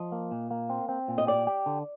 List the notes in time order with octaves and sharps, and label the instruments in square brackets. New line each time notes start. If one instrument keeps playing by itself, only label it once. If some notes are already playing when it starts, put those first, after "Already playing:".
Already playing: [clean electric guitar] F3 [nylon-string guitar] D#5
[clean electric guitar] A#3
A#2
A#3
C4
C4
A#2
[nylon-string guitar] D#5
[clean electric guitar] G4 [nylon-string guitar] D5
[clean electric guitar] G4
D3